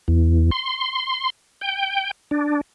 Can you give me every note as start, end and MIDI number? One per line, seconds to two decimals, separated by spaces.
0.08 0.50 40
0.51 1.30 84
1.61 2.11 79
2.31 2.61 62